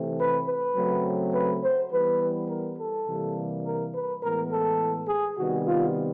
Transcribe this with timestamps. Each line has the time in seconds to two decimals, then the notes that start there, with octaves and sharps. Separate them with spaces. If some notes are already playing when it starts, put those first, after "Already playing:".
Already playing: C3 E3 A3 C4
0.18 B4
0.47 B4
0.76 C#3 F#3 A3 C4
1.33 B4
1.62 C5
1.91 E3 G3 B3 B4
2.48 A#4
2.78 A4
3.07 C3 E3 G3 A#3
3.65 A#4
3.93 B4
4.22 A2 E3 G#3 B3 A#4
4.51 A4
5.08 G#4
5.37 C3 D#3 G3 B3 F#4
5.66 F4